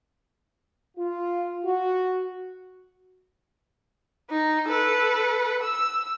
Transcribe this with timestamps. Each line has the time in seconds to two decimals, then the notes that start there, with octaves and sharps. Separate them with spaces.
0.97 F4
1.63 F#4
4.30 D#4
4.68 A4 B4
5.63 E6